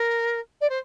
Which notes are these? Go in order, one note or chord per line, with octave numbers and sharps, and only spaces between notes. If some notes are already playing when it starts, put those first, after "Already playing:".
Already playing: A#4
D5
C5